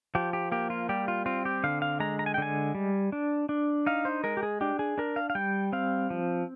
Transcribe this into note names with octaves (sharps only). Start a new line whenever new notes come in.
F3 G4
G4
A#3 G4
F4
G3 G4
F4
C4 F4
G4
D3 F5
F5
G#3 A#5
A#5
G#5
G5
D3 G#5
G3
D4
D4
D#4 F5
C5
G#3 A#4
G4
G#4
D4 G4
G#4
D4 A#4
F5
F5
G3 G5
C4 F5
F3